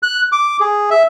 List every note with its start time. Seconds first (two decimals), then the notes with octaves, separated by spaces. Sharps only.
0.03 F#6
0.32 D6
0.60 G#4
0.91 E5